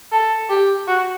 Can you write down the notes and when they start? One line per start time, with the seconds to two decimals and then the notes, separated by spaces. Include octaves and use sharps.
0.12 A4
0.50 G4
0.87 F#4